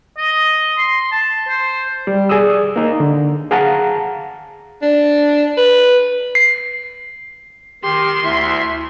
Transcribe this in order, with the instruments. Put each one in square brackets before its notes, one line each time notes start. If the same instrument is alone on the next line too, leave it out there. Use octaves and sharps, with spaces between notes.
[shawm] D#5
C6
A5
C5
[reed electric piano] G3
G#4 D5 D#6 E6
A#3 D#4
D3
G#4 F5 F#5 A5 A#5
[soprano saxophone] D4
B4
[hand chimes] C7
[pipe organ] D#3 [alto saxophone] G4 [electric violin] C6
[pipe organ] D2 E5 [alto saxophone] E4